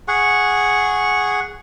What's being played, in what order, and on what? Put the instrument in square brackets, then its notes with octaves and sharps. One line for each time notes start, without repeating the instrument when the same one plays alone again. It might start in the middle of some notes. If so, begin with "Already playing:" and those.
[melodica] G#4 F#5 C#6